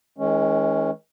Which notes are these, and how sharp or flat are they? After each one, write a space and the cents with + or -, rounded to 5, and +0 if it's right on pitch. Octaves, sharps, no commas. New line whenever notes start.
E3 -45 G#3 +30 C#4 +0